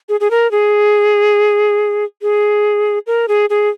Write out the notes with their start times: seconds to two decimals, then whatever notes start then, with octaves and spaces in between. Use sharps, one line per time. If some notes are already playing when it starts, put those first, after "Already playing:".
0.09 G#4
0.20 G#4
0.31 A#4
0.51 G#4
2.22 G#4
3.07 A#4
3.28 G#4
3.50 G#4